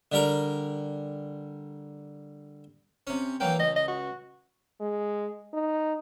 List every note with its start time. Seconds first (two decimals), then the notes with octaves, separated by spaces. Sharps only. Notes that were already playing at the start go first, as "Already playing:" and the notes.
0.12 D3 G3 A#4
3.07 C3 C#4
3.40 E3 F#3 A#3 G5
3.59 C#2 D#5
3.76 D#5
3.88 F#4
4.80 G#3
5.53 D#4